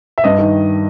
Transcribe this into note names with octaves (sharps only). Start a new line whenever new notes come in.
E5
G2 D#5
D#3